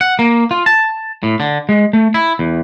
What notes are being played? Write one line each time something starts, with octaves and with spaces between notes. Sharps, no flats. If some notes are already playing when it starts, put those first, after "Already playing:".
F#5
A#3
F4
A5
A2
D3
G#3
A3
E4
E2